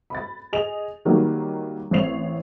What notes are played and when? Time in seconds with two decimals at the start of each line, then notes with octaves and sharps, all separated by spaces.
0.10 B5 A6
0.53 G#4 D#5 F7
1.05 D#3 F#3 G3 A#3
1.91 A1 C4 C#5 C7 F7